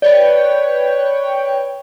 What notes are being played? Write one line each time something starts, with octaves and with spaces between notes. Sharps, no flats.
B4 C#5 D5 G5